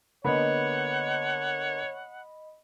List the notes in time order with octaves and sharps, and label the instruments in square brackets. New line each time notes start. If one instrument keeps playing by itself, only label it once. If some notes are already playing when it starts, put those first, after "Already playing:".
[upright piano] D3 A#3 B3 [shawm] C#5 [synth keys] D#5 B5 [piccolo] F#5